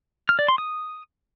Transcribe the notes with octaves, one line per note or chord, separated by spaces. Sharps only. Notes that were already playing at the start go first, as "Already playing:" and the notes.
F6
D5
C6
D#6